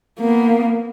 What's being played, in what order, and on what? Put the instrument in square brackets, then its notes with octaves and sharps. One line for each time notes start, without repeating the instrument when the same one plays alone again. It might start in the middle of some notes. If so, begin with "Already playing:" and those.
[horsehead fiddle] A#3 B3